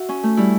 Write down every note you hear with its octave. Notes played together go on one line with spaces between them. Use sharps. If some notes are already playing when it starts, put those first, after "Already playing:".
Already playing: F#4 E5 F#5
C#4
A3
G3 E4